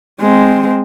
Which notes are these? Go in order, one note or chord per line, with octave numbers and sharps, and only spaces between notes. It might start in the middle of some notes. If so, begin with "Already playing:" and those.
G#3 C4